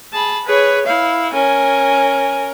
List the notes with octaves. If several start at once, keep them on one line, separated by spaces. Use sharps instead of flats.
G#4 A5 B5
G#4 B4 C#5
E4 F5
C#4 A#4 G#5